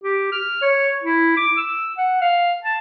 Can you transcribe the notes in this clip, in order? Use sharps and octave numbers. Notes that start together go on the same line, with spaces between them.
G4
F6
C#5
E4
D6
E6
F#5
F5
A5